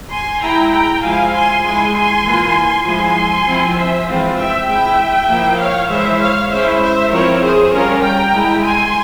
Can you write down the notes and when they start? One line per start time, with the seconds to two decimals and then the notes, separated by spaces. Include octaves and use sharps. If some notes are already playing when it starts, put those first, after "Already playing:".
0.11 G#5 C6
0.42 G#3 E4 G5 A#5
0.72 G5 A#5
1.02 F3 G#3 E4 F5 G#5
1.32 G#5 C6
1.63 G#3 E4 G#5 C6
1.94 G#5 C6
2.25 E3 A#3 F4
2.85 F3 G#3 E4 G#5 C6
3.46 F3 C4 E4
3.76 C5 E5
4.06 E3 G#3 C4 F4
4.37 E5 G5
4.68 G#3 E4 E5 G5
5.29 F3 A#3 E4
5.59 C#5 F5
5.89 E3 G#3 E4 C5 E5
6.20 C#5 F5
6.51 G#3 C#4 E4 C5 E5
6.81 C5 E5
7.11 F3 C4 E4 A#4 C#5
7.42 G#4 C5
7.72 G3 C#4 F4 A#4 C#5
8.03 G5 A#5
8.33 G#3 E4
8.63 G#5 C6